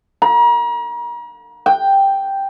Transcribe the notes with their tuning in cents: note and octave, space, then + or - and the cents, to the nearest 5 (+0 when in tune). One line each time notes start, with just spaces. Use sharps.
A#5 +40
G5 +0